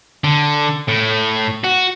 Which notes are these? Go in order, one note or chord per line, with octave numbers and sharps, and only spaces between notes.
D3
A2
F#4